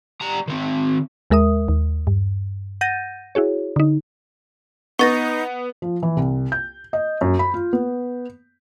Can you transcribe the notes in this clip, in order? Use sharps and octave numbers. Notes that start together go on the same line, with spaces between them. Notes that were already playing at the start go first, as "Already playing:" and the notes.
G3 A#5
D#3 C4
D#2 G#3 A#4 E5 D#6
D#2
G2
F#5 G6 A6 A#6 D#7
E4 F#4 G#4 C#5
D3 D#4
B3 D#4 C#6 A6 A#6
F3
E3
C2
G6
D#5
F#2
B5
F4
B3